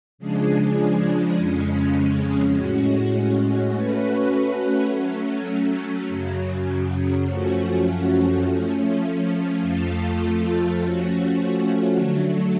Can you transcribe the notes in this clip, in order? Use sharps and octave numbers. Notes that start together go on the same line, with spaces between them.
C#3 F3 G#3 D4 G#4
F2 C#3 G#3 C#4
A2 G#3 C#4 F#4
A3 C#4 F#4 B4
F#3 A3 C#4
F#2 C#3 F#3
F#2 F3 A3 C#4 F#4
F3 A3 C#4
F2 F3 A3 F4 A4
F3 A3 C#4 F#4
D3 F#3 A3